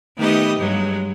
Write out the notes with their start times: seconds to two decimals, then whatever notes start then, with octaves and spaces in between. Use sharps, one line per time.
0.17 D#3 A3 B3 G4 B4 D#5
0.59 G2 F#3 G#3